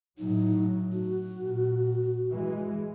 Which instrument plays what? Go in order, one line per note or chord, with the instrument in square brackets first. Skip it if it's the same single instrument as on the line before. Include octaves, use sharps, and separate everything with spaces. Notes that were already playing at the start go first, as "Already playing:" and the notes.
[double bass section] A2 F#3 [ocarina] D#4
[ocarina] F#4
[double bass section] A#2
E3 G#3